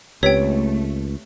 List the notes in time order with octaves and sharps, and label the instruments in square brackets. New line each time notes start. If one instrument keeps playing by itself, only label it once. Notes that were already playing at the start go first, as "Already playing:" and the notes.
[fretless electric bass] C#2 [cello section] A3 [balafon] C4 G4 B4 [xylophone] C#5 G5